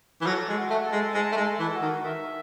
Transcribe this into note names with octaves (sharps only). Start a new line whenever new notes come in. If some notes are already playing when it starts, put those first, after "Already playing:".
E3
F#3 A4
G#3
F#4
A3
A4
G#3
G#3 A5
A3
G#3
A4
E3
F#4
D#3
D#3 E5